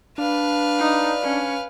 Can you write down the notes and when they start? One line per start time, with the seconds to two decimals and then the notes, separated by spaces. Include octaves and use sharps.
0.18 D4 B4 F5
0.79 D#4
1.22 C#4